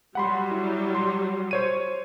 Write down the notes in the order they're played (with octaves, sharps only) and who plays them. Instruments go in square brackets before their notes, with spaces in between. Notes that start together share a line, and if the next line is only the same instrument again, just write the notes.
[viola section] F#3 G3 [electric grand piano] F#5 B5 C6
[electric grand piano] E4
C6
C5 C#5 D#7